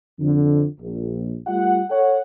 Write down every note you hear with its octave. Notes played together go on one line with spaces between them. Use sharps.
F2 D3
A#1
G3 A3 F4 F#5
A4 C#5 F#5